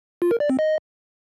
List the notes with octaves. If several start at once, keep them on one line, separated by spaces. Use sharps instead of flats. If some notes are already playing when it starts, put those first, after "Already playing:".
F4
A#4
D5
C4
D#5